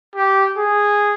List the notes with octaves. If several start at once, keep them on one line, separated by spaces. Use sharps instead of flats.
G4
G#4